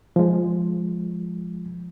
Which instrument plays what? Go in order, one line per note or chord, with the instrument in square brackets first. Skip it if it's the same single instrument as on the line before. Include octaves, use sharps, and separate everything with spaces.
[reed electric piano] F3 G#3